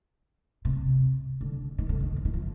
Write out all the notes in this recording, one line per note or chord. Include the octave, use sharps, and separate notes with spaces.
C3
D3
D#3
D3
D#3
F3
D#3
F3